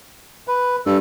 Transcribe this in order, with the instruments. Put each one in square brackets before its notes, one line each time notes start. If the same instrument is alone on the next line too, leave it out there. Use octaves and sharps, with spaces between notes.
[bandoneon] B4
[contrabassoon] G2 [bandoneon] A4